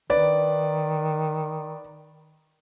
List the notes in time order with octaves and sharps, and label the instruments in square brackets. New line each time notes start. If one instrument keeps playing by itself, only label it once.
[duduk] D#3 [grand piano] B4 D5